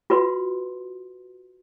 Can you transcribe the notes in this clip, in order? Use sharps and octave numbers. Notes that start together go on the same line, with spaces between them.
F4 F#4 B4 C6